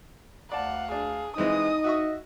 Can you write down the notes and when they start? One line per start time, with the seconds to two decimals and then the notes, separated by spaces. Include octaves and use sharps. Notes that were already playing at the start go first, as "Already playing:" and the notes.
0.52 D2 D5 F5 F#5 A5
0.91 D4 G#4
1.37 E3 G#3 C4 D#4 D#5 D#6
1.84 F#4 E5 C#6